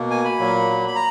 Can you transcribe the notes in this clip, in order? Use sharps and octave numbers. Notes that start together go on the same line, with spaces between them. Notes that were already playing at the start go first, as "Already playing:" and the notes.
Already playing: B2 A#3
G#5
B5
A#2 F#3 A#3
B5
A#5